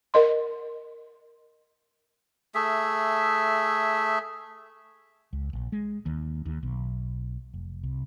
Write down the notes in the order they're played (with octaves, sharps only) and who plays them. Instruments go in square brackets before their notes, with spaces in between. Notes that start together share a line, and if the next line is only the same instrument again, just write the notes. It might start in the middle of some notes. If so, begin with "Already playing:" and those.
[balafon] A#4 D#5 C6
[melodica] A3 G#4 E5
[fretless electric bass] C#2
A#1
G#3
D#2
D#2
B1
F1
C2